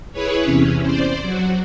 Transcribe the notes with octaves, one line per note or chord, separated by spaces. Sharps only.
E4 G#4 B4 C#5
E2 C3 C#4
C5 D5
F#3 F#4